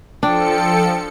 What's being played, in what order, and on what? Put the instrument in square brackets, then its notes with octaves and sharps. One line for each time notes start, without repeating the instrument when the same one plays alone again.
[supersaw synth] F3 A4 C#7 [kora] D4 [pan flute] G5